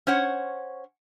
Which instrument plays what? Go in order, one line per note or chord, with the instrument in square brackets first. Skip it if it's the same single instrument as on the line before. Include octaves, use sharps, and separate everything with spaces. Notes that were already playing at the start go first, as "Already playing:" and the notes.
[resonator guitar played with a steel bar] C#4 C5 C#5 F#5